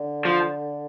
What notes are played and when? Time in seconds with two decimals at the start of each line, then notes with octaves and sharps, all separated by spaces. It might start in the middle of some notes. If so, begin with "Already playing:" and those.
Already playing: D3
0.25 F3